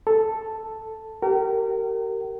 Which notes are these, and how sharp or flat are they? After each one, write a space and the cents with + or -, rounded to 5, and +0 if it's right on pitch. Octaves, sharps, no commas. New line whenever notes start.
A4 +0 A5 +0
G4 -30 A#4 -25 G5 -45